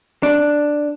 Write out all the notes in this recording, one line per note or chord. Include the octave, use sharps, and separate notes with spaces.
D4